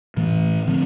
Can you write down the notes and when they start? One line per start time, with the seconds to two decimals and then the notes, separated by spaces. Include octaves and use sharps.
0.17 A2 E3 A3
0.67 D3 F3 C4